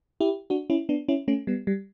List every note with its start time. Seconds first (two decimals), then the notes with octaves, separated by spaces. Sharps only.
0.20 E4 G4
0.50 D4 F#4
0.70 C#4 E4
0.89 B3 D4
1.08 C#4 E4
1.28 A3 C#4
1.47 G3 B3
1.67 G3